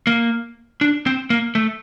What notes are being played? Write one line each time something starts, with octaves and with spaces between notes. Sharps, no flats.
A#3
D4
C4
A#3
A3